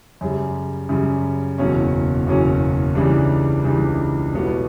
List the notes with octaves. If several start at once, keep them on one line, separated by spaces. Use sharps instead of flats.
F#2 C#3 G3
F#2 C#3 G3
F#1 E2 B2 F#3 C#4
F#1 E2 B2 F#3 C#4
C#2 C#3 E3 G3 D4
C#2 C#3 E3 G3 D4
B1 A2 G3 B3 F#4